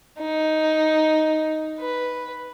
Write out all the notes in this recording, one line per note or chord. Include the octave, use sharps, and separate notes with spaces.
D#4
B4